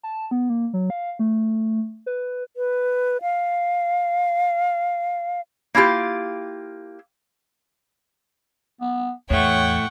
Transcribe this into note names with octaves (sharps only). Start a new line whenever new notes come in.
A5
B3
A#3
F#3
F5
A3
B4
B4
F5
A#3 E4 F4 G4
B3
E2 A2 A3 C#5 F#5 G5 C#6